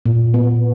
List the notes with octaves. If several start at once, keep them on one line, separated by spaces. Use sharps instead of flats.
A#2
B3